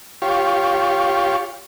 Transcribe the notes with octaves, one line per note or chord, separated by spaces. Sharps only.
F4 G4 C#5